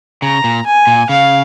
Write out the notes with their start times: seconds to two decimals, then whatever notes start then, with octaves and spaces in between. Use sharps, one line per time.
0.22 C#3 A#5
0.44 A#2
0.66 G#5
0.87 A#2
1.09 C#3 F5